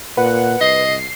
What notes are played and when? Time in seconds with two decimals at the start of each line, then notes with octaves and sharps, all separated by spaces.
0.17 A#2 B4 F#5
0.61 C2 D#5 C7